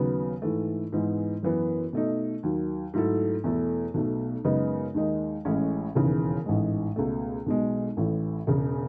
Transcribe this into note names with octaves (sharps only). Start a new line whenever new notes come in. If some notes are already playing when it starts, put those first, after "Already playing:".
Already playing: D#2 C#3 F#3 B3
G#2 E3 A3
G#2 E3 G#3 B3
F#2 E3 B3
B2 A3 D#4
D#2 D#3 F#3
G#2 F#3 A3 E4 A4
E2 B2 A3 E4 A4
B1 B2 A3
F#2 C#3 G#3 B3 D#4
D#2 D#3 G#3 D#4
A1 A2 G#3 C#4
E1 D#2 C#3 E3
A1 G#2 E3 G#3
C#2 B2 A3
B1 B2 G#3
A1 A2 E3
E1 E2 C#3